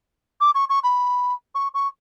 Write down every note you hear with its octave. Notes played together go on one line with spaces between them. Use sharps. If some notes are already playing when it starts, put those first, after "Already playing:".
D6
C#6
C#6
B5
C#6
C#6